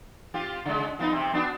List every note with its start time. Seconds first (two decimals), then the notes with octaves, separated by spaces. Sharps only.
0.34 C4 F4 G4
0.65 C#3 G#3
0.99 F3 B3 D#4
1.12 C3 C4
1.33 B3 D4 F#4